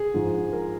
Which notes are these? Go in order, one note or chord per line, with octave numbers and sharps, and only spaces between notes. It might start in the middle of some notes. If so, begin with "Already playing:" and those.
Already playing: G#4
G#2 F3
A#4